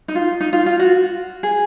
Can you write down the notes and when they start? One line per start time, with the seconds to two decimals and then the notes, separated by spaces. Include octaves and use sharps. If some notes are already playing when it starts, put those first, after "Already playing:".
0.08 D#4
0.15 F4
0.41 D#4
0.53 F4
0.66 F4
0.79 F#4
1.43 G#4